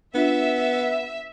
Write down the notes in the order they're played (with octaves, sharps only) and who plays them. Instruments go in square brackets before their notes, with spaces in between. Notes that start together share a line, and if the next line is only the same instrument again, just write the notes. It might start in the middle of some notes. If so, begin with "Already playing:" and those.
[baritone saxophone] B3 [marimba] D4 F4 [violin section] E5